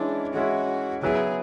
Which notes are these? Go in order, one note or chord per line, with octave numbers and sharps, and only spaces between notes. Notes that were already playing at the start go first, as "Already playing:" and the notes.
Already playing: E3 G#3 C#4 D4 E4
E3 G#3 C#4 E4 F#4
C#3 F#3 B3 E4 G#4